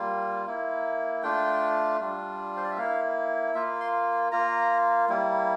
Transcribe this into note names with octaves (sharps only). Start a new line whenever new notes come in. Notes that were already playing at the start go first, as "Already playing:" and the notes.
Already playing: G3 A#3 F4
A#3 E4
A3 D4 F4 G5
G3 D4 F4
C5
D5
E5
A#3 E4 F5
A#3 F4 E5
C6
A#3 F4 A#5
G3 A#3 E4